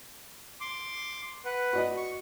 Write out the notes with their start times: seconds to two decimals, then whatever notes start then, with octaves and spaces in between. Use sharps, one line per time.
0.61 C6 D6
1.45 B4 F#5
1.73 F#4 D5 D#5
1.97 C#6